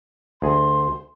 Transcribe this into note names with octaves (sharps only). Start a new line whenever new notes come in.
D2 G#4 C6